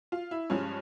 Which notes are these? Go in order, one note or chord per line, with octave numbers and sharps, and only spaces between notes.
F4
E4
G2 F3 G#3 C#4